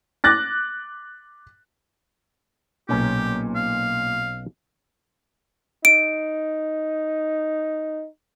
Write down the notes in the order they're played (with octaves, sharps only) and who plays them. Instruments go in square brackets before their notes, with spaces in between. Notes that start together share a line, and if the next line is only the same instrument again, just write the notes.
[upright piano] D6 F#6 A6 A#6
[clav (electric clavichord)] B1 C#4 A#5 [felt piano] A#2 [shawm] G4
[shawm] F5
[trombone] D#4 [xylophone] D7